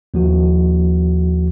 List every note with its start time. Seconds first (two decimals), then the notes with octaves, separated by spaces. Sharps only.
0.14 D#2 F3 F#4